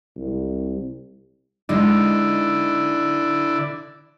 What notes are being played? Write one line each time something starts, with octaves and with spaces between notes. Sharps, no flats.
C2
D3 G#3 D#4 E4 D5